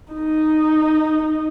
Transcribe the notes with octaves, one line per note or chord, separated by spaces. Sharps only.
D#4